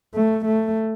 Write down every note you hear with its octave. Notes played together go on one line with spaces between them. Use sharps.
A3
A3